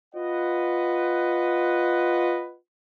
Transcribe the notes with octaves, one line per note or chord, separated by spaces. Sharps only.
F4 B4 D#5 F#5